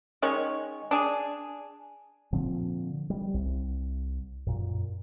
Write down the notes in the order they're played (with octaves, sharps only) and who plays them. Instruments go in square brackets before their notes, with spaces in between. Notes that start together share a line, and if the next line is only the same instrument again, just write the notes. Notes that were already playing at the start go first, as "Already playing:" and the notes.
[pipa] D#3 G#3 C#4 C#5
D4 G#4
[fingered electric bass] A#2 D3 F3 C4
G3
C2
F#2 A#2